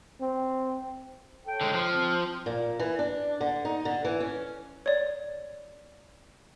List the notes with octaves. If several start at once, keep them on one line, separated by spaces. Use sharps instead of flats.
C4
A4 C#5 G5
D3 G#3
F3
C4
A#2
E3
D4
D3
D#4
D3
E3
C#4
C#5 D5